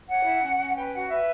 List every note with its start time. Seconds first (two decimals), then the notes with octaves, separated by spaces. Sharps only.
0.08 C#5 F#5
0.25 E4
0.42 C#4
0.59 C#4
0.76 B4 G5
0.93 F#4 F#5
1.10 B4 E5